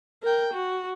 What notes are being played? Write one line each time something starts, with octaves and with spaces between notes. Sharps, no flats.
A#4 G5
F#4